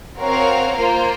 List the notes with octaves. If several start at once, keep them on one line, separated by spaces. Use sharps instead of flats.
C4 F#4 A#4 C#5 F5
A#3 F4 C5